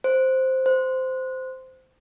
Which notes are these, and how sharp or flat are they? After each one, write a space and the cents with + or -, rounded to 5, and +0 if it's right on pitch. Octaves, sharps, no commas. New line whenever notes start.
C5 +0
C5 -15